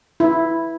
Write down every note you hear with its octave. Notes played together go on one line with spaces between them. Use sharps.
E4